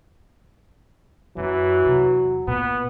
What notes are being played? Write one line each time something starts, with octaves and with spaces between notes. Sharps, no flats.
F#2 E3 F#3 E4
E2 C3
A#2 B3